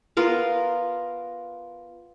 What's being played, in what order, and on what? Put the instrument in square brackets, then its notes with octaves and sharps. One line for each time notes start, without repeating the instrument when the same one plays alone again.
[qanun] B3 F4 A#4 F5